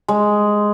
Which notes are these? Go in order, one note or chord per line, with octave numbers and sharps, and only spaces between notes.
G#3